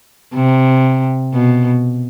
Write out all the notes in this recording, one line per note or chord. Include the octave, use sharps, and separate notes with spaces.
C3
B2